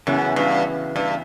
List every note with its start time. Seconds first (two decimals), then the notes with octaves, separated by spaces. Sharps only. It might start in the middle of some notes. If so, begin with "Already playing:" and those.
0.07 F#2 C#3 E3 B3
0.36 G2
0.96 G2